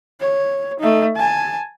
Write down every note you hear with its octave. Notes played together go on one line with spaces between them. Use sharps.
C#5
A3 D#4
G#5 A5